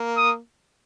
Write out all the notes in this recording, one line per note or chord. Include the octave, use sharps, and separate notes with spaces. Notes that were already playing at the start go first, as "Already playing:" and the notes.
Already playing: A#3
D#6